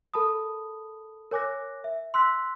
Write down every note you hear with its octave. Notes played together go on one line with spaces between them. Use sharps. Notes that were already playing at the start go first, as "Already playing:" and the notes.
A4 A#4 A5 B5 D#6
A#4 C#5 G#5 D6 F#6 A#6
E5
C6 E6 F#6 B6